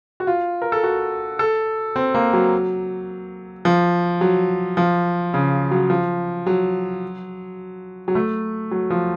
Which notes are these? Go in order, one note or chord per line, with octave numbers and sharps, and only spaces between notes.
F#4
F4
A#4
A4
F#4
A4
C4
A#3
F#3
F3
F#3
F3
C#3
F#3
F3
F#3
F#3
A3
F#3
F3